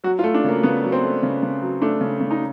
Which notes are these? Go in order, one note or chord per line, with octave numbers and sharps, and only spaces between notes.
F#3 F#4
F4
A3
D4
C#3 A#3
C#3 B3
F#3
C4
A3
C#3
C#3
F#3
A3 D4
C#3
C#3
D#4